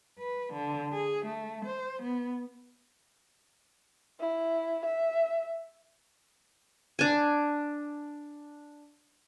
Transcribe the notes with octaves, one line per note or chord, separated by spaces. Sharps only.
B4
D3
G#4
A3
C5
B3
E4
E5
D4 G#5